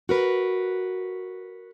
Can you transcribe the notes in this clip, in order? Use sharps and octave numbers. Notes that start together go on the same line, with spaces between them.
F#4 A#4 B4